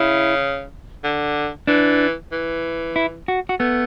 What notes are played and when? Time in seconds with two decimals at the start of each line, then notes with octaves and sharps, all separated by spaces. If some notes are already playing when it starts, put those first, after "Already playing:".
Already playing: C#3 E4
1.04 D3
1.67 E3 D4
2.32 E3
2.96 E4
3.28 F#4
3.49 F#4
3.60 A3 B3